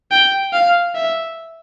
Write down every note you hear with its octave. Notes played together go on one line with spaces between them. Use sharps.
G5
F5
E5